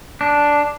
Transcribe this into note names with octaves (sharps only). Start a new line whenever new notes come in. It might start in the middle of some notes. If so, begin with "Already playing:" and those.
D4